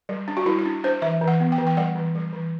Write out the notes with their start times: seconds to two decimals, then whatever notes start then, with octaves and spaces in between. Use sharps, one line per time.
0.09 G3
0.28 D4
0.37 F#4
0.46 G3 E4
0.59 E4
0.65 D4
0.84 D4 C5
1.02 E3 E5
1.21 E3
1.28 F#5
1.40 B3
1.52 G5
1.58 E3
1.67 G5
1.77 G3 F#5
1.95 E3
2.15 G3
2.33 E3